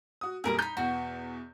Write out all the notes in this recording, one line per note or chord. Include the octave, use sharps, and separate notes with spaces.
F#4 D#6
F2 A#2 G3 G#4 A#4 D#6
D#4 B5 G6
E2 B2 F#4